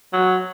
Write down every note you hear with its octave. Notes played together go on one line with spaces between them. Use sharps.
F#3